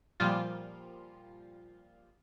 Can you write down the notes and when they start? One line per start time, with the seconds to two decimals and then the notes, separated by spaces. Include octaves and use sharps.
0.20 A#2 F3 G3 F4